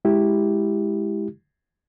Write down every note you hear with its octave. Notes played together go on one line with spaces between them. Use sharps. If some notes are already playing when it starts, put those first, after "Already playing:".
G#3 E4 G4